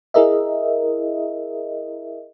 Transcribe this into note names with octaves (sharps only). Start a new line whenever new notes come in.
E4 G#4 A#4 D#5 E5